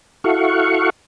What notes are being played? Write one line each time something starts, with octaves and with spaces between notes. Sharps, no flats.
E4 F#4 A4 F5 F#5 C#6